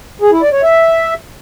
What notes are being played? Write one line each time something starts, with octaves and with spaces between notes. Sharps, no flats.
G#4
E4
D5
C#5
E5